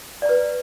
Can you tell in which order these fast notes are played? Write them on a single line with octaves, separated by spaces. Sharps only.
D5 A#5 B4